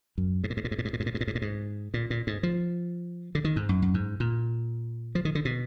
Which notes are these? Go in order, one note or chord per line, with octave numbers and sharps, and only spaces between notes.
F#2
G#2
A#2
G#2
A#2
G#2
A#2
G#2
A#2
G#2
A#2
G#2
A#2
G#2
A#2
G#2
A#2
A#2
G#2
F3
D3
D#3
G#2
F#2
F#2
G#2
A#2
F3
D#3
D3
B2